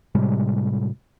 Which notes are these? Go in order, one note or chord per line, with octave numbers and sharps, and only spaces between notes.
A2 C3 G3 G#3